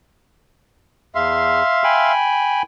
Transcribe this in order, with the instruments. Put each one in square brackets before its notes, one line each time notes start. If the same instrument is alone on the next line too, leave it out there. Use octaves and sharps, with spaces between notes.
[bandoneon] E2 [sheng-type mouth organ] E5 F5 C6
[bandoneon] G5 G#5 B5